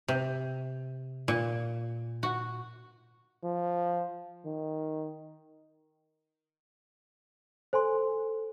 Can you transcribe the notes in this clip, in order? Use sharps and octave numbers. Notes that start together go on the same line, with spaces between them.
C3
A#2
F#4
F3
D#3
A4 C5 G#5 C6